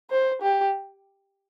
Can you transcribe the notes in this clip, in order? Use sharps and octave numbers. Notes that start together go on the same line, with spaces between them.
C5
G4